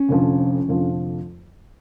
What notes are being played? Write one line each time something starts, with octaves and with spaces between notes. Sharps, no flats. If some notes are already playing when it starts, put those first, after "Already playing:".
Already playing: C#4
F1 F2 D3 F3
F1 F2 D3 F3